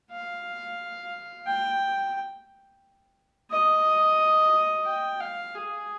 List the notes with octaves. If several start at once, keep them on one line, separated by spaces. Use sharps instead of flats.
F5
G5
D#5
G5
F5
G#4